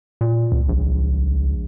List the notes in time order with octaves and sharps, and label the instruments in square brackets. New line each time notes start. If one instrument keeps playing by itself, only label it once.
[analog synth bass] A#2
[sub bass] C#2
[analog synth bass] A#1